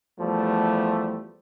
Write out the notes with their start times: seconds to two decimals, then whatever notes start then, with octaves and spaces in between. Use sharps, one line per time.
0.19 E2 F3 G3 A3